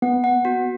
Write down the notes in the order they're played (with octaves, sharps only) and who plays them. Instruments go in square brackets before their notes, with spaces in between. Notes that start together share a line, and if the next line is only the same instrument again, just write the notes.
[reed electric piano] B3 [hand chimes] F#5
[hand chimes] F#5
F#4